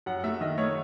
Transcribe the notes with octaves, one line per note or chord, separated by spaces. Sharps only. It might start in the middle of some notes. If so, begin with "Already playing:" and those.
F#2 F#5
A3 E5
D#3 D#5
A3 C#5